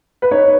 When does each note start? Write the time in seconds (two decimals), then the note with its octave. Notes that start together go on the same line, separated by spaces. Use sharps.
0.22 B4
0.31 D#4 C#5